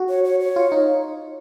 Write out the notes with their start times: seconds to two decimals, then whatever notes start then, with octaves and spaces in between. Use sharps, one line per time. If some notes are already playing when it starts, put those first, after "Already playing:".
Already playing: F#4
0.09 C#5
0.24 C#5
0.40 C#5
0.56 F4
0.72 D#4